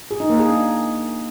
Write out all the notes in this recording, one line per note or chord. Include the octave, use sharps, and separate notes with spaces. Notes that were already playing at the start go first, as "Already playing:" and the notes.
G#4
D#4
A#3
G#4
D4